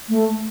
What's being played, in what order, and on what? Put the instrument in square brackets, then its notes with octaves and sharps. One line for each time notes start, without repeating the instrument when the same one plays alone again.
[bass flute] A3